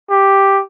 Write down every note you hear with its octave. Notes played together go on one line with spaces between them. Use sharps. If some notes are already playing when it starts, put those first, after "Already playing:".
G4